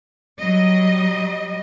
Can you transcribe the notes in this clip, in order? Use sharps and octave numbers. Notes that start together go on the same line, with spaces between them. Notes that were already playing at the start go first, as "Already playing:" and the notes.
F#3 G3 D#5